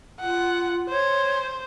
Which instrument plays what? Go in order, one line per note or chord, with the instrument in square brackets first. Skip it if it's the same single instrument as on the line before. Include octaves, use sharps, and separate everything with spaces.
[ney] F4 [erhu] F#5
[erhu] C5 [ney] C#5